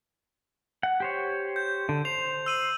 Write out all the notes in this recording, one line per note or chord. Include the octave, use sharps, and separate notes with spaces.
F#5
G4 C5 C#5
G6
D3
C5 F7
E6 D#7 F#7